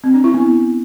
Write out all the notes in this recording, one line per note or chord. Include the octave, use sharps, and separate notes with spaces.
C4
D4
E4
B3